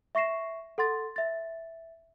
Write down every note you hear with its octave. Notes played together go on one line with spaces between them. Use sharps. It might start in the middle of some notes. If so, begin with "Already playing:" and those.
E5 C#6 A#6 C7 E7
A4 F#5 C6 A6
E5 A6